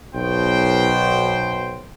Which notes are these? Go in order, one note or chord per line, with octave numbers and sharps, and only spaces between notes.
B1 B2 C5 G5